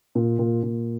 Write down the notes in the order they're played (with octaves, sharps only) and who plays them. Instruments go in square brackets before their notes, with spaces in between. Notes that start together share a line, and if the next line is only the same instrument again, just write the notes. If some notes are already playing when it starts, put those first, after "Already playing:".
[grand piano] A#2
A#2
A#2